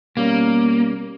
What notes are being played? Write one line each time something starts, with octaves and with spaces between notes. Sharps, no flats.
B2 G3 A#3 C#4